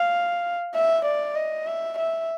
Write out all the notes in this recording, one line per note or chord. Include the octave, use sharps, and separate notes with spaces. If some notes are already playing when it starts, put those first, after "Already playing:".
Already playing: F5
E5
D5
D#5
E5
E5